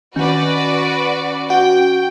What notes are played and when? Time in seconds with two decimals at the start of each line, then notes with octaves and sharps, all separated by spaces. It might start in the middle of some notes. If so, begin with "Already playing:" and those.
0.16 D#3 C#4 F#4 B4 D5
1.50 F#4 G5